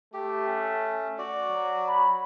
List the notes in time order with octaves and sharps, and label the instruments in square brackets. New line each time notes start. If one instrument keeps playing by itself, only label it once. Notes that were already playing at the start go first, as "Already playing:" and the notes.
[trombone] A3 [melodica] G4
[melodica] C#4
F#4 D5
[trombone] F#3
[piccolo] B5